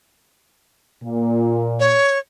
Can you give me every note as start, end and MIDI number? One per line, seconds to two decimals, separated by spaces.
1.03 1.95 46
1.80 2.19 73